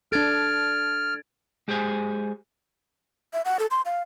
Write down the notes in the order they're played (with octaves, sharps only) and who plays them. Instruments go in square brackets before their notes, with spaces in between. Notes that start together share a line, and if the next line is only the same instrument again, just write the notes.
[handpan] D4 A4 [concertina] F6 [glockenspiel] G#6 A6 D7
[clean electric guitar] G#3 G4 G#4 C5 G#5
[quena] E5
F#5
A4
C6
F5